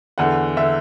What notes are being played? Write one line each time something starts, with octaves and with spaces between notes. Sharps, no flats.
E2 D3 F#5
D3 E5